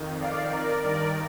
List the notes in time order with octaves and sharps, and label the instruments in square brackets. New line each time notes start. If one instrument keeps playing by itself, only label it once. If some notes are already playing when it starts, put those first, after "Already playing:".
Already playing: [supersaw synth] F2 D#3
D5 F5
A#4 D5
G2 D#3 A#4 D5